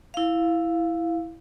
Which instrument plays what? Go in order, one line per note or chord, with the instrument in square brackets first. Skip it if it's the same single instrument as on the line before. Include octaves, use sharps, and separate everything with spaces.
[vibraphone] E4 F5